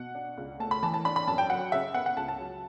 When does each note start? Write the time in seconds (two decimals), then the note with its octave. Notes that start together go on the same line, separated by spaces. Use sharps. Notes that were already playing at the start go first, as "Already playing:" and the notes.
Already playing: B2 F#5
0.15 D4
0.37 C#2
0.60 A3 A5
0.71 B5
0.83 E3 A5
0.94 A5
1.05 D4 B5
1.16 B5
1.27 F#2 A5
1.38 G5
1.50 F#3 F#5
1.72 C#3 E5
1.94 B3 F#5
2.06 F#5
2.17 C#2 A5
2.28 A5
2.39 F#3